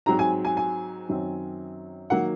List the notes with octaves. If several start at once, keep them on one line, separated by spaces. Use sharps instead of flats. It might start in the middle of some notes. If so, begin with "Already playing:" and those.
G#2 F#3 C4 A#5
G#5
G#5
G#5
F#2 D#3 F#3 C4
D#3 F#3 A#3 F#5